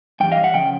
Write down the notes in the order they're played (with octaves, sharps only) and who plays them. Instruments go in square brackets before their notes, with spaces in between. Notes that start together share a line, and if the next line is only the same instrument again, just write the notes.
[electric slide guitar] G2 E3 G3 G5
D#5 F5
E5 F#5
C#3 F3 G5